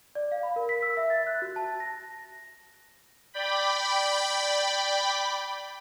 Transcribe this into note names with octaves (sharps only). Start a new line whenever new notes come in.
D5
F5
B5
A#4
B6
E6
E5
A6
F#6
F#4
A5
A#6
D5 G5 B5